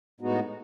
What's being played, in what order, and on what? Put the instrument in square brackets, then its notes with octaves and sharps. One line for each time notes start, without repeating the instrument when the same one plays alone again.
[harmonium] A2 G#3 B3 D#4 F#4